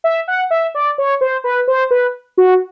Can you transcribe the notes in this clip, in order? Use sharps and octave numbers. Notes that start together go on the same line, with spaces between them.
E5
F#5
E5
D5
C#5
C5
B4
C5
B4
F#4